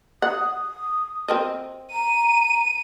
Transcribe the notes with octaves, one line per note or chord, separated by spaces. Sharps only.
F#5 D#6
C4 A#4 D#5
A#5 D#7